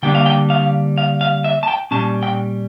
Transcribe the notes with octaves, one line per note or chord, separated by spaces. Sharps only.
D3 G3 A#3 D4 G5
F5
G5
F5
F5
F5
E5
A5
G5
A#2 G3 C#4 A5
G5